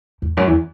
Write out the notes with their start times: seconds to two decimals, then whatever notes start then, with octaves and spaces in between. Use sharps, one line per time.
0.22 E2
0.37 F#2
0.47 E2